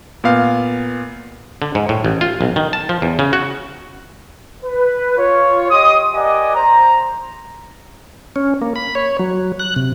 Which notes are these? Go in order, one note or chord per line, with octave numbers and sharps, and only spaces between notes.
A#2 B3 F5
D3
G#2
A2
A1
F4
B1
D#3
A5
F3
E2
C#3
F#4
B4
F4 C#5
G4 D#5 C6 D#6
G4 A#4 D5 D#5 F#5 G#5
C5 A#5
C#4
A#3
B5
C#5
F#3
F#6
C3